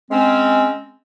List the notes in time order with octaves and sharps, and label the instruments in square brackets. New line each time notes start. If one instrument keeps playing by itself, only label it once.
[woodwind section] G#3 C4 C#4